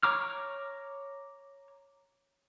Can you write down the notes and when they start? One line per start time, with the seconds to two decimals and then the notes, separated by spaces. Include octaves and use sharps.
0.03 C#5 A#5 D6 F6